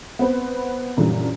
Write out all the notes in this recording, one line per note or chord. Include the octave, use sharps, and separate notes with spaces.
B3 C4 B4 C5
F#2 A#2 D3 E3 F3 G3